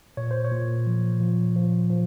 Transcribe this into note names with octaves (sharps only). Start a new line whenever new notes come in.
A#2 C#5
C5
C#5
A#2
F3
F3
F3
F3